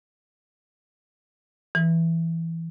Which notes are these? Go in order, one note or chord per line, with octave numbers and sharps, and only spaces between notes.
E3